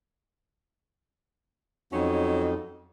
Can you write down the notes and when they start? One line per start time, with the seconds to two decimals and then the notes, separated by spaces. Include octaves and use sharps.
1.93 F2 F#3 C#4 D#4